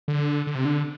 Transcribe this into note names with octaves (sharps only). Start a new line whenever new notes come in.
D3
D3
C3
D3